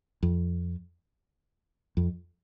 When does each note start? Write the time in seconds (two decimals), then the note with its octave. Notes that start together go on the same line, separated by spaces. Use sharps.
0.23 F2
1.97 F2